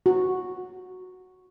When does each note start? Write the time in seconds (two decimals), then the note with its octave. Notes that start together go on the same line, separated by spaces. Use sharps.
0.06 F#4